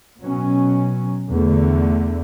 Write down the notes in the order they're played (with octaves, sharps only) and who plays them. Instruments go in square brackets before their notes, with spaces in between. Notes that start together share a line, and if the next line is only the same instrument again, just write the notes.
[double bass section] B2 F#3 C#4
E2 D3 A3